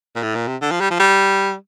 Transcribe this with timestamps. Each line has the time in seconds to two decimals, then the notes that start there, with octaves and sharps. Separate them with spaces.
0.15 A#2
0.23 A2
0.35 A#2
0.48 C3
0.62 D3
0.71 F3
0.80 G3
0.91 F3
1.00 G3